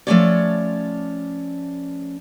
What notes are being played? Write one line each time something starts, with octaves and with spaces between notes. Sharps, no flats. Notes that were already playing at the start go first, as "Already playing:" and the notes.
F3 A3 A#3 C#4 C#5 D5